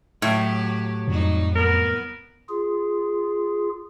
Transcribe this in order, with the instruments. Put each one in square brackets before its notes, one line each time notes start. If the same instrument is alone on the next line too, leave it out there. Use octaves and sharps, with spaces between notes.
[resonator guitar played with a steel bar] A2 [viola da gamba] F#3 G4
[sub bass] F2 [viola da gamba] F#3 G3 D#4
[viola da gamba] B3 [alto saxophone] A#4
[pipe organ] F4 G#4